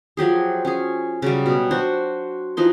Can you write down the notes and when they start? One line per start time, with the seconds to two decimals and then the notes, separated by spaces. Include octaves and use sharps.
0.17 F3 F#3 G4 G#4
0.65 C#4 G#4
1.22 C#3 F#3 G3
1.46 B2
1.71 D4 F#4 C5
2.57 E3 F3 D#4 C6